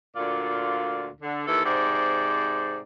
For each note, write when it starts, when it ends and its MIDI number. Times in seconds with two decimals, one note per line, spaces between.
0.16 1.07 38
0.16 1.07 46
0.16 1.07 65
0.16 1.07 74
1.21 1.45 50
1.47 1.62 39
1.47 1.62 52
1.47 1.62 69
1.65 2.78 44
1.65 2.78 48
1.65 2.78 72
1.65 2.78 74